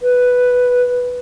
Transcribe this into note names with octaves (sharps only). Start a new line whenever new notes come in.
B4